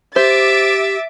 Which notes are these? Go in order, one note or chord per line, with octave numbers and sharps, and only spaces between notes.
G4 C5 E5 D6 A6